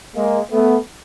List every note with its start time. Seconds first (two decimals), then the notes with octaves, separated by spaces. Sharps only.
0.14 G#3 A#3
0.51 A3 B3